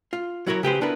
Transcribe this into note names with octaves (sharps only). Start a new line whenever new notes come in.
F4
F#3 E4 F#4 A#4 C#5
C#3 G4 B4 C5
B3 D4 E4 F4 A#4 B4